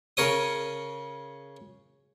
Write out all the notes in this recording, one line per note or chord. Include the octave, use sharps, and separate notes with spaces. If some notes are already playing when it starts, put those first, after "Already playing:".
C#3 A#4 C#5 D#6